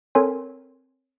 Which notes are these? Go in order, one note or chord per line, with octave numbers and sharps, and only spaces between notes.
C4 A4 A#4 C#5 G#5 C6